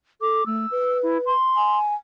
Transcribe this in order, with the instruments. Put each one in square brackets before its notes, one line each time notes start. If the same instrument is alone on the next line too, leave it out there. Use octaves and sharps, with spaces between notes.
[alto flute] A4 [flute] D6
[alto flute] A3 [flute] E6
[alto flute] B4
[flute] E4
C6
[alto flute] G#5